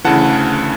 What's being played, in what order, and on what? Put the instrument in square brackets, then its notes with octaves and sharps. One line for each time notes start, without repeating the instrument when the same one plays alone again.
[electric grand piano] D2 C#3 E3 F#5 A5